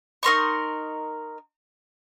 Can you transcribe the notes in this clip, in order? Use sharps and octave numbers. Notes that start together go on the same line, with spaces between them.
D#4 A#4 C6 C#6